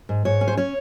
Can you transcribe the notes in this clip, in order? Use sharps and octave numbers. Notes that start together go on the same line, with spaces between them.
G#2
G#2 C#5
C#4
C5
C#4 C#5